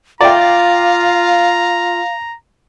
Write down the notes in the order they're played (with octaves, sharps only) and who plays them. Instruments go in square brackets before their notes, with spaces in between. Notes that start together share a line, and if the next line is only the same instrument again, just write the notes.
[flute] F4 [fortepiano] D5 E5 G5 [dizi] F5 [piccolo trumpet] A#5